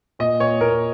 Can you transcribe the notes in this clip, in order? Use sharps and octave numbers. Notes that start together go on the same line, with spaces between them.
A#2 D#5
A#2 C#5
A#2 A#4